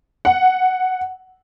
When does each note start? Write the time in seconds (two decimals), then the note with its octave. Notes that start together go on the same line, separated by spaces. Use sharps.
0.25 F#5